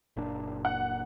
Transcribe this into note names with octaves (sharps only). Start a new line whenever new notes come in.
F#1 A#2 D4
F#5